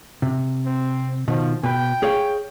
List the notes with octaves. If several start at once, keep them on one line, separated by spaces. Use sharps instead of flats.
C3
C4
B2 D#3 F3
B2 B4 G5
G#4 C#5 F5